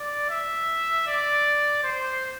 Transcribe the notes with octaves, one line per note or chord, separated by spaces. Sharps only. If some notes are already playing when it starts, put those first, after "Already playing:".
Already playing: D5
E5
D5
C5